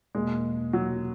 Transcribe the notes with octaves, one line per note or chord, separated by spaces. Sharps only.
E2 B2 G#3 A#3
F#3